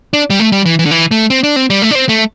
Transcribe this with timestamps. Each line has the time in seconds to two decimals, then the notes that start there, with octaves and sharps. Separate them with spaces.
0.13 D4
0.30 G3
0.40 A3
0.52 G3
0.66 E3
0.79 E3
0.86 D3
0.91 E3
1.11 A3
1.30 C4
1.44 D4
1.56 C4
1.70 G3
1.82 A3
1.91 D4
1.95 C4
2.09 A3